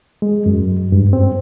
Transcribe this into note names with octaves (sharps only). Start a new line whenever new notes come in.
G#3
F#2
G2
C4